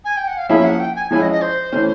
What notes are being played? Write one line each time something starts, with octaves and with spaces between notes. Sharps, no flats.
G#5
G5
F#5
F5
F3 A#3 C#4 E4 G#4 E5
F#5
G5
G#5
F3 G#3 C#4 E4 G#5
D#5
D#5
C5
E3 A3 C#4